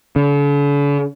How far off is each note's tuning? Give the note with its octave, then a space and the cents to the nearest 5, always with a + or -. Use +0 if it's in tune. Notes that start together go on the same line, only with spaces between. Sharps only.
D3 -45